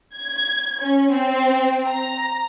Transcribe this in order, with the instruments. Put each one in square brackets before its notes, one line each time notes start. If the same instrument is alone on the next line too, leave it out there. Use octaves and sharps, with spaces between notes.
[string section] G#6
C#4
C4
A#5